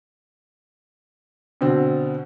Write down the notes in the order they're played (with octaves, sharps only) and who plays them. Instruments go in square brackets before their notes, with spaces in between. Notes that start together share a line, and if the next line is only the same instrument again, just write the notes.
[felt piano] B2 D3 C4